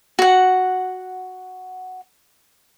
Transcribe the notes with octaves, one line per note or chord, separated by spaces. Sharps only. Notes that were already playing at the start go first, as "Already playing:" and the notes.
F#4 F#5